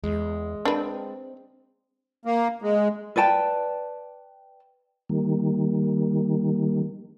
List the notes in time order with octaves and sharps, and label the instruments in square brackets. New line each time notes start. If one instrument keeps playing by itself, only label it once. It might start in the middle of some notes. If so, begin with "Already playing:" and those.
[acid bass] E2 [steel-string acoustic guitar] G#3
[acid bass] C4 [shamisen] D4 B4
[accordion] A#3
G#3
[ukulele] B4 D5 G5 A5
[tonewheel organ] D#3 G3 A#3